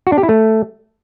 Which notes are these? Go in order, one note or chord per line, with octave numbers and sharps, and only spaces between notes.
F#4
D4
G4
E4
A3